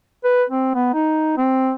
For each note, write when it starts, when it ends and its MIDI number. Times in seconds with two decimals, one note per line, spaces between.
0.24 0.43 71
0.50 0.71 60
0.75 0.92 59
0.94 1.36 63
1.37 1.73 60